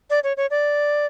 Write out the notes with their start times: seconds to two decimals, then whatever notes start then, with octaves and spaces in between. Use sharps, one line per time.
0.10 D5
0.24 C#5
0.37 C#5
0.51 D5